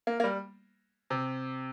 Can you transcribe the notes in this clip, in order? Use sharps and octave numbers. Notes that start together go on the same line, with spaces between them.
A#3
A#3
G3
C3